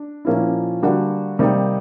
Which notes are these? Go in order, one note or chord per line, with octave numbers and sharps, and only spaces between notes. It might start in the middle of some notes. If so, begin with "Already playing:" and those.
Already playing: D4
A#2 F3 A#3 C#4 E4
D3 G3 A#3 D4 F#4
C3 D#3 G3 A#3 D#4